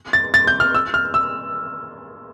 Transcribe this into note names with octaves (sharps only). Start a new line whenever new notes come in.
A6
A6
G6
F6
E6
F6
E6